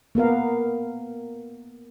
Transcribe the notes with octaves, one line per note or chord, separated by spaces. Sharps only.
A#3 B3 A#4 F5